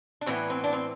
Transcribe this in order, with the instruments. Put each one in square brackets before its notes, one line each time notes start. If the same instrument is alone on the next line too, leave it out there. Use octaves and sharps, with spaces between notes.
[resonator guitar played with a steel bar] D4
A2 E3 B3 C4
C4
D4
C4